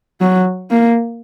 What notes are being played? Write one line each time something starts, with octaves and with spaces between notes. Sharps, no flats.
F#3
A#3